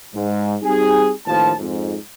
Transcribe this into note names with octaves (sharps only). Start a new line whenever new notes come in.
G#2
G3 C4 D#4 G4 G#4
A1 D#2 F3 A5
F2 G#2